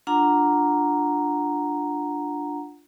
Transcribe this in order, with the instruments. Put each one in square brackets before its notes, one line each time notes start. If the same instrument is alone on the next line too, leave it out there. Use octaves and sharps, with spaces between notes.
[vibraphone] D4 F4 F#5 A#5